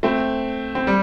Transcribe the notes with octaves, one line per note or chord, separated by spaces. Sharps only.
A3 C4
C4
G3